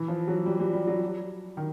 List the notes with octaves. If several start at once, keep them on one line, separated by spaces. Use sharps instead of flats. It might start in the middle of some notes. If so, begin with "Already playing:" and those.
Already playing: E3
F3
F#3
G3
G3
G3
F#3
D#3